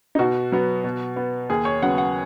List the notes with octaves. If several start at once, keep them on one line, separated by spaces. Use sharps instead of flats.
D#4
B2 F#4
F#3 B3
B2
B3
D#2 G#4
C#5
C#3 F#3 B3 F#5
F#5